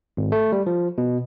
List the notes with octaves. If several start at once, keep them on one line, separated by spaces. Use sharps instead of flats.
G#1
A3
G3
F3
B2